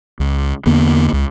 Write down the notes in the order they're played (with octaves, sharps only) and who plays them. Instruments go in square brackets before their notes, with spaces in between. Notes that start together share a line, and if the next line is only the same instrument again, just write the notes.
[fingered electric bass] C#2
E2 D3 A#3 B3
C#2